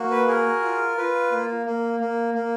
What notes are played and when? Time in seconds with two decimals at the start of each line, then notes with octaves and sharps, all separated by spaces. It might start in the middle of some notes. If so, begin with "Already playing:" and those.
Already playing: A#3 F#4
0.11 B4
0.27 G#4 A#4
0.62 F4
0.97 F4 B4
1.32 A#3
1.66 A#3
2.00 A#3
2.34 A#3